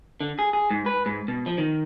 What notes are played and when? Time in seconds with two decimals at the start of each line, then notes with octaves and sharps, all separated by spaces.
0.20 D3
0.39 G#4
0.53 G#4
0.71 G#2
0.86 B4
1.06 G#2
1.28 B2
1.46 F3
1.58 D#3